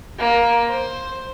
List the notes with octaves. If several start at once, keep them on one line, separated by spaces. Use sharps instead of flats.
A#3
C5